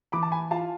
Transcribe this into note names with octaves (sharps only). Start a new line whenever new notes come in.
E3 B5 D6
A5
G#5 B5
F4 F5 A5